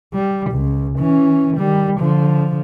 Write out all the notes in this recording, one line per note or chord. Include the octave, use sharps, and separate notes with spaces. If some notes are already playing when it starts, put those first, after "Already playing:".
G3
C#2
E3 C#4
D#3 G3
D3 F3